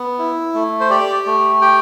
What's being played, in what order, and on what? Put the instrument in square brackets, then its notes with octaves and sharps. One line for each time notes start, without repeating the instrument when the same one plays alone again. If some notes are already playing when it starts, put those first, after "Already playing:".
Already playing: [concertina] B3
E4
A3
C5
G4 D5
A3
G4 G5